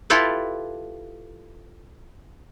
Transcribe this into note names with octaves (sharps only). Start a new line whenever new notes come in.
E4 F4 G4 A4 B4